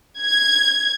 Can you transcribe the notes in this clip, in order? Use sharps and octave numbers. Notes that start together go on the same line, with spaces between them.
G#6